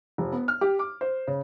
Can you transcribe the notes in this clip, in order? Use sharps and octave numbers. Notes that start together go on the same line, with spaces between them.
F1
B3
F6
G4
D6
C5
C#3